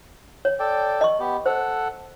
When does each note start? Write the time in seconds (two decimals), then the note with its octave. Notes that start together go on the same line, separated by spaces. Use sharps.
0.45 C#5
0.60 A4 D5 G5
1.01 D#5 C#6
1.20 B3 G4
1.46 A4 C5 F#5